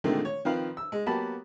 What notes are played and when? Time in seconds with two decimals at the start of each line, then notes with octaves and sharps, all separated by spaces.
0.04 A#2 D3 D#3 G#3 A3 C4
0.25 C#5
0.45 D#3 F3 C4 B4 F5
0.77 E6
0.92 G#3
1.06 F#3 A#3 B3 G4 A5 B5